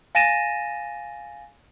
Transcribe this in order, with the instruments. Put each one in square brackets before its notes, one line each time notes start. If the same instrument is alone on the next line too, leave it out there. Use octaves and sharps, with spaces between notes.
[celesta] F5 G#5 A6 A#6 D#7 E7